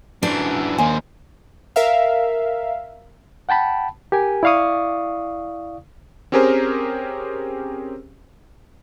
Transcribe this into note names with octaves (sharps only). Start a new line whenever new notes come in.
F#2 E3 D4 C5
D#2 A#3 C5 G#5
A#4 E5 F5
F#5 G5 A5 B5
G4 A#4 G#5
E4 D5 F5 C#6 D#6
C4 C#4 G4 G#4 A#4 C5